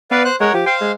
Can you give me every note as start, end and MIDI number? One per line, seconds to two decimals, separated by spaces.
0.11 0.29 59
0.11 0.23 71
0.11 0.23 74
0.11 0.23 77
0.25 0.36 72
0.25 0.36 90
0.40 0.53 56
0.40 0.53 70
0.40 0.53 73
0.40 0.53 78
0.53 0.62 53
0.53 0.65 67
0.66 0.92 72
0.66 0.92 77
0.66 0.75 79
0.66 0.92 84
0.81 0.93 56